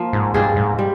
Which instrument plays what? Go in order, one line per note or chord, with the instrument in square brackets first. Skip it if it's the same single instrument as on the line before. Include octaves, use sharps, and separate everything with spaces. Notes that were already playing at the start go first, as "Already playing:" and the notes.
Already playing: [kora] F3 A#3
[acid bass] G#2
[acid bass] G2 [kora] C4 F4 G#4
[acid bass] G#2
[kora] G3